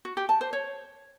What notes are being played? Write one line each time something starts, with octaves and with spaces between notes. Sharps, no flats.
F#4
G4
A5
C5
C#5